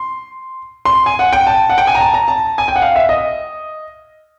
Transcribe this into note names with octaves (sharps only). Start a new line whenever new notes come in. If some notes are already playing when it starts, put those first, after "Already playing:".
Already playing: C6
C6
G#5
F#5
G5
A5
F#5
G5
G#5
A#5
A5
A#5
A5
G#5
G5
F#5
F5
E5
D#5